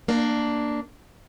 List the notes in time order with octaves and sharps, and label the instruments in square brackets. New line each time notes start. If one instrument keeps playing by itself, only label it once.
[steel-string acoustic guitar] A#3 D4